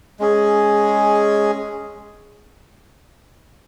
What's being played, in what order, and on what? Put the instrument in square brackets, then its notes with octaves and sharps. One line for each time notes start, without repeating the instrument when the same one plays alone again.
[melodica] G#3 C#4 G#4